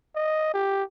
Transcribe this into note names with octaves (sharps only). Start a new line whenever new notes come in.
D#5
G4